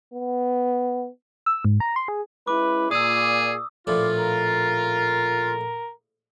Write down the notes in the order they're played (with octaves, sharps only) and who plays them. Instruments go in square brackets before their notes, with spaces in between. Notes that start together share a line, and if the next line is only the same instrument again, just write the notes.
[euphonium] B3
[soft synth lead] E6
G#2
A#5
C6
G#4
[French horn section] G#3 C#4 E4 [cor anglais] B4 [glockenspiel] D6
[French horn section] A#2 [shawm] G#4 [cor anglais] D5 [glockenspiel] D#6 E6
[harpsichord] A#1 A2 [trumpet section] F4 [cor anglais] D5
[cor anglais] A#4